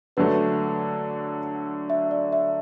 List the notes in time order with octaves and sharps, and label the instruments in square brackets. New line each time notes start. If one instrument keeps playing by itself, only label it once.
[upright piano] D3 F#3 A3 [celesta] B4
[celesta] E5
D5
E5